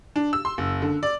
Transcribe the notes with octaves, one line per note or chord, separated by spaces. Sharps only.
D4
E6
C6
F#1
D3
D5